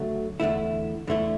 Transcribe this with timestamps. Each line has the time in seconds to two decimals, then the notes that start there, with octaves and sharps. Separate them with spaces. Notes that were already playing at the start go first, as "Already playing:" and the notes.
Already playing: D2 D3 F#3 A3
0.40 E2 D3 A3 E4
1.07 E2 D3 A3 E4